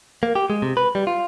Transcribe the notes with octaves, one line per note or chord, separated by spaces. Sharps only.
A#3
G4
G#3
C3
B4
G3
F4